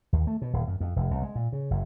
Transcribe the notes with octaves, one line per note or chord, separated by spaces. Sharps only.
D#2
A3
B2
D#1
F#2
F2
F1
C2
G#3
A#2
C#3
F#1